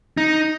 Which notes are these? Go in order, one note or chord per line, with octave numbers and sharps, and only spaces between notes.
D#4